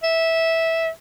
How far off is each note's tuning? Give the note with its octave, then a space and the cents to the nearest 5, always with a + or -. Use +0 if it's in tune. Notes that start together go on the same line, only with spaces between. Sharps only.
E5 -10